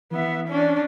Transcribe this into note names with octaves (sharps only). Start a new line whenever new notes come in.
E3 B3 E5
C#4 D4